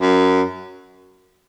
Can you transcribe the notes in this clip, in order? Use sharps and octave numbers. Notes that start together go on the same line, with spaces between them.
F#2